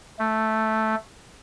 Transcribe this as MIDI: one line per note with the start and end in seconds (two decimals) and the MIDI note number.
0.19 0.95 57